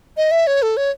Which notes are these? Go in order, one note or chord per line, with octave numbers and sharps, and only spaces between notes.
D#5
E5
C#5
A4
C#5